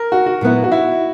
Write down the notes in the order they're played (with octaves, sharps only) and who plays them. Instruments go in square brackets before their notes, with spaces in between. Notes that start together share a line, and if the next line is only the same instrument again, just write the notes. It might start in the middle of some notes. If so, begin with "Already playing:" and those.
Already playing: [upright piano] A#4
F#4
F#4
[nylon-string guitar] A#2 F#3 B3 E4
[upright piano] F#4
E4